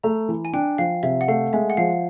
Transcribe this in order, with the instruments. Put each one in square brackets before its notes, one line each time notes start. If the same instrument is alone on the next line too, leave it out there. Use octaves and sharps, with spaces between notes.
[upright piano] A3 [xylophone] A#5
[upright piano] E3
[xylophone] G#5
[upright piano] D4 [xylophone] G5
[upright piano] F3 [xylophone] F5
[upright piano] C3 [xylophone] E5
[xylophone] F#5
[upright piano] A3 [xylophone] F5
[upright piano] G#3 [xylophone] E5
[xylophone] F#5
[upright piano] F3 [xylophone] F5